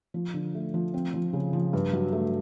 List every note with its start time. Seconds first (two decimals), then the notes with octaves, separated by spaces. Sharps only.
0.14 F3
0.34 D3
0.54 A3
0.74 F3
0.94 C4
1.14 F3
1.33 C#3
1.53 F3
1.73 G2
1.93 F#3
2.12 A3